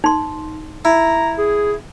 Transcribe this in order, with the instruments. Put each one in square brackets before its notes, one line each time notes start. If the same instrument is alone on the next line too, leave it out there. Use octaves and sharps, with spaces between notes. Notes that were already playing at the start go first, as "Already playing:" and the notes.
[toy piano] D#4 C6
[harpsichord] E4 [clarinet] A#5
[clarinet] G#4